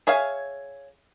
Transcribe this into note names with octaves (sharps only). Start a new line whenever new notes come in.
G#4 C#5 E5 F5 G#5